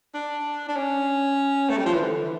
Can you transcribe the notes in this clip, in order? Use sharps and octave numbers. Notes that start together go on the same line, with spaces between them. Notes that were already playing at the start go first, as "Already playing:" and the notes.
D4
D4
C#4
A3
G3
F3
E3
D3
E3